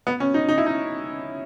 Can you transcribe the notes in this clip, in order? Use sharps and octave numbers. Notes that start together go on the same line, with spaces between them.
B3
C#4
D#4
D#4
E4
D#4